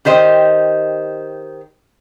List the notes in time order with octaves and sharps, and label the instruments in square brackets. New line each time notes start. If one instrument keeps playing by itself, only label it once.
[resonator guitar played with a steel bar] D#3 G4 C5 D#5